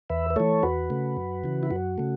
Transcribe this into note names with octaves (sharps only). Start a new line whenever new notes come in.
E2 B4 E5
B4
E3 A3 A4 C#5
E2 F#4 B4
C#3 A3
F#2
C#3 E3
E4
F#2 F#4
C#3 A3